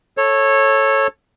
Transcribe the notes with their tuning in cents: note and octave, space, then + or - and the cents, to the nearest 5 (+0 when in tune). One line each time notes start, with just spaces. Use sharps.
A4 +0 C#5 -15